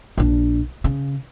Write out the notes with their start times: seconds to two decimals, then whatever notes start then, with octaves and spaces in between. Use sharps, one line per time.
0.18 A#1 D4
0.84 C#3